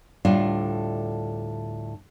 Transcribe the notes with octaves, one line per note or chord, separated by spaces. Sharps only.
D2 A2 G3 D4 F4